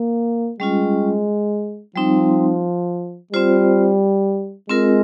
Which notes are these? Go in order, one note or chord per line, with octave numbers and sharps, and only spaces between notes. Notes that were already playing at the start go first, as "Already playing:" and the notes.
Already playing: A#3
G3 G#3 C#4 F4
F3 G3 C4 D#4
G3 C4 F4 C5
G#3 C4 F4 A#4